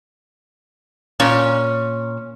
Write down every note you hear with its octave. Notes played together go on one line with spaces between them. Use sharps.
A#2 C#4